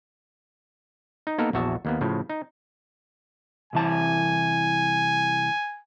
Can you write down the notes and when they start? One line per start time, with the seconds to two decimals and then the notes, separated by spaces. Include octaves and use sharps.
1.27 D#4
1.38 A#3 B3 D#4 A4 A#4
1.53 A#1 E2 F#4 E5 A5
1.85 D#2 A#3 B3
2.01 A2 C#3 F3
2.29 D#4
3.73 C2 E3 G#5 A5